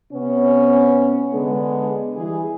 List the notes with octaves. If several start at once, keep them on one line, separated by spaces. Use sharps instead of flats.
C3 B3 C#4
D3 G#3 B3 D4
E3 G3 G#4